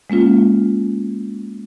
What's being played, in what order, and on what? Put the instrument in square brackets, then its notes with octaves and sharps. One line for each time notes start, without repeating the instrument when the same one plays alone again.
[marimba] G#3 A#3 C#4 F4